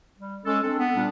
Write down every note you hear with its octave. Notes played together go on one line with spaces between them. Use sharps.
G3
G#3 C#4 A4
C4 D4 A4
B3
A#2 G3 D4